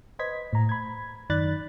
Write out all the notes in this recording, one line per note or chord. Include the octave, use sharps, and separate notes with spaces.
B4 C5 D#5 G#6 B6
A2 A#5
B5 G#6
F#2 D#3 D5 B5 F#6 A6